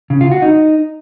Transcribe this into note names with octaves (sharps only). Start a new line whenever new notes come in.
C#3
F4
F#4
D#4